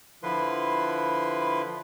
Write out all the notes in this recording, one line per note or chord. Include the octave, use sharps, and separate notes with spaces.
D3 F3 E4 B4 C6